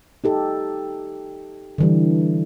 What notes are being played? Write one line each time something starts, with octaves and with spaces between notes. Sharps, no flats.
D#4 G4 A4
D3 E3 G3